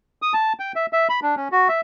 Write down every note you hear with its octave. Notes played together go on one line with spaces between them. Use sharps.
D#6
A5
G5
E5
E5
B5
D4
C#4
F#4
E5